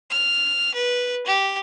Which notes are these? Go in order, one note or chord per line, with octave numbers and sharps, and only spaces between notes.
F6
B4
G4